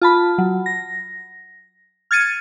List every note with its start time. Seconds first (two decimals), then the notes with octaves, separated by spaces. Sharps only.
0.01 F4 A5 B5
0.38 F#3
0.66 A#6
2.11 F6 G#6 A6 C#7 D#7